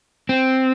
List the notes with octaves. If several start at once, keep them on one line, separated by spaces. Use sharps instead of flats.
C4